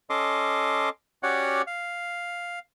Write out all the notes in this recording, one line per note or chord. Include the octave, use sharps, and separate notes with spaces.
C#4 A4 D#5 C6 D6
C#4 F#4 G4 C#5 D5 F#5
F5